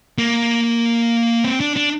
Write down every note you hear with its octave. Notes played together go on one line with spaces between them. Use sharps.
A#3
C4
D4
D4